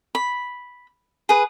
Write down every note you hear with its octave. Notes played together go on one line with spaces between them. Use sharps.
B5
G#4 B4